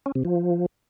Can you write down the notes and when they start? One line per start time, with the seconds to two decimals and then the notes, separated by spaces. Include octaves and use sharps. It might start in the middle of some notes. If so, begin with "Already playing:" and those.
0.06 C#4
0.15 C3
0.25 F3